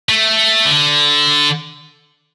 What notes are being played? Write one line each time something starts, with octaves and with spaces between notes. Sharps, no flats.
A3
D3